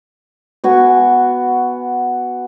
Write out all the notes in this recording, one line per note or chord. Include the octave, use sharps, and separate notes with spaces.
B3 F#4 F#5 G#5